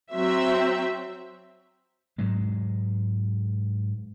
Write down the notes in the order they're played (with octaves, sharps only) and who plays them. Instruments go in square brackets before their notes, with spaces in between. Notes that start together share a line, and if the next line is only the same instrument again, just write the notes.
[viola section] F#3 C4 E5
[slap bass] G#2 F#3 G#3